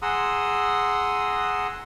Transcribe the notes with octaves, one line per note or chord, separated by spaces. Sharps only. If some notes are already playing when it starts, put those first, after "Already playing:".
G#4 F#5 A#5 C6 D#6 E6